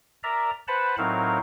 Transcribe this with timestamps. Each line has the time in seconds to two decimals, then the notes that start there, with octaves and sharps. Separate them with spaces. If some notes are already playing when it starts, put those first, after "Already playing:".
0.23 A#4 D5 E5 A#5
0.68 B4 C5 F#5 A5 B5
0.98 A2 F#3 C4 D#4 A#4 F5